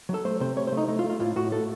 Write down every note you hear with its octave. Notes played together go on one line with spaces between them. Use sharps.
F#3
A4
A3 C5
C3 C5
A3 C#5
C5
A3 D#4
A3 D#4
F4
A3
F4
A2 F4
A2 F#4
A3 A4